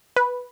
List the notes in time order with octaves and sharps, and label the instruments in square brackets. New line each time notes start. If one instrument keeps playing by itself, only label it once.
[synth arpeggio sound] B4